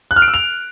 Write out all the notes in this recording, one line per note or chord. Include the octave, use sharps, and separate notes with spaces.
F#6
F6
D7
E6
F7